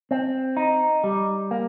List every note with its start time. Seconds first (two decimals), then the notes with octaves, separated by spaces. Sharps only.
0.11 C4
0.57 D#4
1.04 G3
1.51 A#3